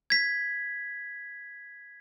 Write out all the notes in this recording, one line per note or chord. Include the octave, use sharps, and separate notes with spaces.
G#6 B6